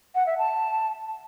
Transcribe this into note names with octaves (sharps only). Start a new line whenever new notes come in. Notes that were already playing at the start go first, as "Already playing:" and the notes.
F#5
E5
A5